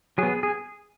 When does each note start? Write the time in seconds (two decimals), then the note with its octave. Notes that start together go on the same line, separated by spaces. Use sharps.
0.18 F#3 B3 G#4
0.43 G#4